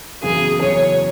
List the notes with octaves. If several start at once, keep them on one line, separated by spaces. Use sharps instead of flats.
F#1 E2 C#3 F#3 G#4
F#1 E2 C#3 F#3 C#5